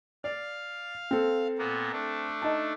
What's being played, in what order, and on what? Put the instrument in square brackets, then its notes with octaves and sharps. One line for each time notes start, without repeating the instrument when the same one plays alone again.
[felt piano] D5 [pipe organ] F5
[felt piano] C4 A4
[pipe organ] A#2 A#3 B3
A3 D4
[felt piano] D#4 A5